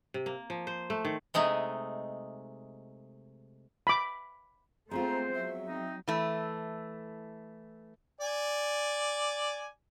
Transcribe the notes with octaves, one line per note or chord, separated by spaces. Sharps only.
C3
A#3
F3
C5
A3
D#3
C3 G#3 A3 D#4
B5 D6
G#3 A3 B3 C4 F4 C5 A#5
F#3 E5
C4 D#4
E3 A3
D5 G#5